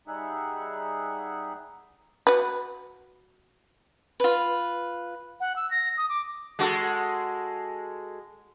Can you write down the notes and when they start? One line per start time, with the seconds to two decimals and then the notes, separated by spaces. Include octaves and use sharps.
0.07 G3 D#4 G#4 E5 F#5
2.27 F#4 B4
4.20 F4 B4
5.40 F#5
5.56 E6
5.71 A#6
5.97 D#6
6.09 D6
6.59 G#3 F#4 A4